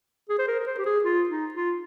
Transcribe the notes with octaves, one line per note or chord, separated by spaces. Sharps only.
G#4
C5
A#4
A#4
C5
G4
G#4
F4
D#4
F4